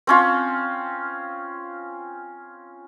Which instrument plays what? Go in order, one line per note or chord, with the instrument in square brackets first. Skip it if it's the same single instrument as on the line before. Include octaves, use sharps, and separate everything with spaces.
[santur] C4 C#4 F4